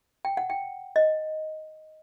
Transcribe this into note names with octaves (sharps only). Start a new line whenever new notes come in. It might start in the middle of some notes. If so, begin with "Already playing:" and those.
G5
F#5
G5
D#5